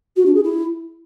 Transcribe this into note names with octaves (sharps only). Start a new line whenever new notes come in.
F#4
D4
G#4
E4